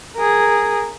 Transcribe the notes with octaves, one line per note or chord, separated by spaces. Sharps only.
G#4 A#4